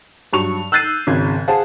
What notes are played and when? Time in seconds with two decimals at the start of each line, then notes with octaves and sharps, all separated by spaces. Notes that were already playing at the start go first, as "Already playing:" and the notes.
0.33 G2 F#3 C#6 F7
0.72 E6 F#6 G6 A6 C7 D#7
1.07 G#1 C#3 G#6
1.48 G#4 C5 F5 F#5 A5